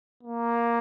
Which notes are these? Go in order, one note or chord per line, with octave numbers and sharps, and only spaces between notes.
A#3